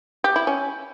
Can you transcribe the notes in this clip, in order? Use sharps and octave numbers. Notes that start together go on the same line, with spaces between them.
G4
E4
C#4